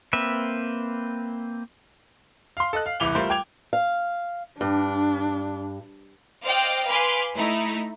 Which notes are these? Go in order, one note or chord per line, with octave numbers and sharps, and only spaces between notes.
A#3 C4 B4 E5
F5 C6
A4 D#5 F#6
F5
E1 C2 E3 D6 F7 G7
G3 A3 F4 A#4 C5
G5 D6 G#6 F7
F5
G2 D4
C5 D5 D#5 F5 G5
B4 F5 G#5 B5 C6 D6
A3 D#4 E4